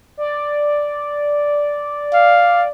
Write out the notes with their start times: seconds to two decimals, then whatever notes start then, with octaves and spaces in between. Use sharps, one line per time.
0.17 D5
2.14 F5